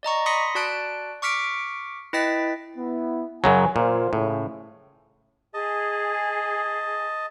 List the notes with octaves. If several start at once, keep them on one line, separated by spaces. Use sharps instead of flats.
D5 D#5 A#5 C#6
B5 C6 D#6 A#6 B6 C#7
F#4 D5 A5 F#6 D7
C#6 D6 F6 B6 C#7 D7
E4 B4 D#5 G5 A6 B6
B3 E4
F#2 C#3 F#3 G#5
A#2 F4 C5 F5
A2 C#3
G#4 D#5 A5